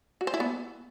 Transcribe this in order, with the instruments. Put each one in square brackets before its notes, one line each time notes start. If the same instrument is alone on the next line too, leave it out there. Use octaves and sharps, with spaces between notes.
[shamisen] F#4
C5
E4
B3